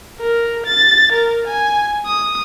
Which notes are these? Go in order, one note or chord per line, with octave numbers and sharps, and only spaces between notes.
A#4
A6
A#4
G#5
D#6